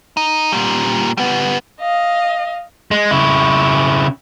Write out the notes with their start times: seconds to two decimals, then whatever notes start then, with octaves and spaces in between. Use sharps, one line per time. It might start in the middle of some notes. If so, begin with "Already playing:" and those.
0.17 D#4
0.52 A#2 G3
1.18 G3 B3
1.80 D#5 F5
2.91 G#3
3.11 C#3 E4